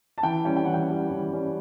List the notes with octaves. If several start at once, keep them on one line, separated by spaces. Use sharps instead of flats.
A5
E3 G5
G3 C#4 G5
G5
E3 F#5
G5
G3 C#4
E3
G3 C#4